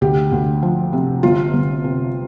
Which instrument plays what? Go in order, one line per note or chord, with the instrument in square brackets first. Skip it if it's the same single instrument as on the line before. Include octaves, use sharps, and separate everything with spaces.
[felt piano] D2 G4
D2
F3
C3
G1 F4
G1
C3